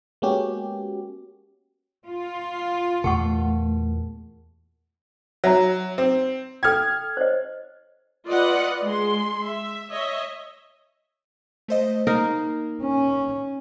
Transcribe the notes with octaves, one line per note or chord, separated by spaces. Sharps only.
G#3 A#3 B3 C#4 F#4 G4
F4
E2 A#2 A3 G4 F#5 C#6
F#3 E5 A#5
C4
A4 G5 F6 G#6
C5 C#5 D#5
F4 B4 D5 D#5 F#5
G#3 C6
E5
C#5 D#5 E5
A3 C5 D#5
A#3 D#4 A#4
C#4